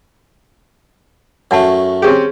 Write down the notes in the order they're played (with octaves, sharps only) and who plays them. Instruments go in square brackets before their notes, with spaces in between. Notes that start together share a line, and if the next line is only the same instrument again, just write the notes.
[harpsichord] F#2 A3 [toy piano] C#5 F#5 A5
[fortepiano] C4 C#4 G4 [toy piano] G#4